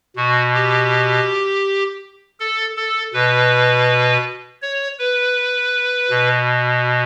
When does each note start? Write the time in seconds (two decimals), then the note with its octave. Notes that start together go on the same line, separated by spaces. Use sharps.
0.16 B2 F#4
0.54 G4
2.40 A4
2.77 A4
3.14 B2 B4
4.62 C#5
4.99 B4
6.10 B2